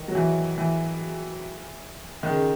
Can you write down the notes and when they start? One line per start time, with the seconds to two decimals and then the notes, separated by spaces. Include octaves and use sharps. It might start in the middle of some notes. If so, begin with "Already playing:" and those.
Already playing: D#3
0.08 F#3
0.15 E3
0.58 E3
2.23 D#3
2.29 C#3